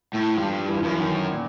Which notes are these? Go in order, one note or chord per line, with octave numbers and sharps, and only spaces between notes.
A2
G2 F3
E3
F3
F#2 E3
D#3
A#2